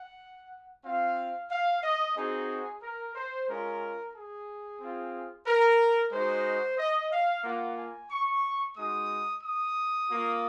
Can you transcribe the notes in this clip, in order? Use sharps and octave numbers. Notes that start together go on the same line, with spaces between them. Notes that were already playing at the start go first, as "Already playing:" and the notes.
Already playing: F#5
C4 F4 F5
F5
D#5
C4 D#4 F#4 G#4
A#4
C5
G#3 C#4 F4 A#4
G#4
C4 F4
A#4
G#3 D#4 F#4 C5
D#5
F5
A#3 F4 F#5
G#5
C#6
G#3 D#4 F#4 D#6
D#6
A#3 F4